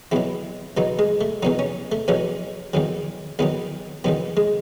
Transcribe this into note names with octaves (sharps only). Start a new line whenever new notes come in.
E2 B2 F#3 E4
E2 B2 F#3 D#4
G#3
A3
E2 B2 F#3 D#4
C#4
A3
E2 B2 F#3 C#4
E2 D#3 F#3
E2 D#3 F#3 B3
E2 D#3 F#3 B3
G#3